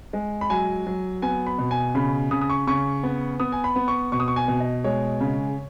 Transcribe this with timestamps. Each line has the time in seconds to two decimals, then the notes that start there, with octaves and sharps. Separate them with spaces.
0.13 G#3
0.41 B5
0.50 F#3 G#5
0.86 F#3
1.22 B3 G#5
1.47 B5
1.58 B2
1.71 G#5
1.95 C#3 B5
2.31 C#3 D#6
2.41 D#6
2.50 C#6
2.67 C#3 C#6
3.03 B3
3.40 B3 D#6
3.52 G#5
3.64 B5
3.76 B3
3.88 C#6
4.12 B2 C#6
4.20 D#6
4.28 C#6
4.36 G#5
4.48 B2
4.60 D#5
4.84 G#3 C#5
5.21 C#3